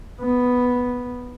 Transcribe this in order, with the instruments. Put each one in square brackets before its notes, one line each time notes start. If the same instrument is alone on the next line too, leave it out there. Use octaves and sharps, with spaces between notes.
[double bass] B3